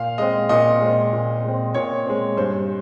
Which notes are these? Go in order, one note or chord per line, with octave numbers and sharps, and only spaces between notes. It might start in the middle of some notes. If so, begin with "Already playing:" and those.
Already playing: A#2 F5
G#3 C4 D#5
A#2 D#5
G#3 C4
A#2
G#3 C4
A#2 C#5
G#3 C4
G2 C5